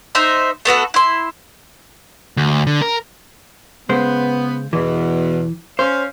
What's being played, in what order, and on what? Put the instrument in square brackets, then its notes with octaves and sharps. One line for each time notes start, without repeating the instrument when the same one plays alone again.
[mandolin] D#4 C5 E5
A3 B3 F#4 A4
E4 C6
[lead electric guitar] D2
D3
A#4
[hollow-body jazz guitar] C#3 G#3 C5 [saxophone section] B3
[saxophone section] E2 B2 [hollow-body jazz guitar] E3
[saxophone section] C#4 F5 [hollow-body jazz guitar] C5